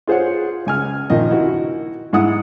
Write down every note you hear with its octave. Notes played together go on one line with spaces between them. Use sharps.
F4 G#4 C5 C#5 F#5
C#2 G#5 F6
A#1 D#3 F3 D#5
E4 F#4
G#2 E4 F#5 D#6